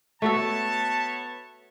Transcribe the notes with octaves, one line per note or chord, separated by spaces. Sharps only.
A3 B3 F#4 A4 C#5 A5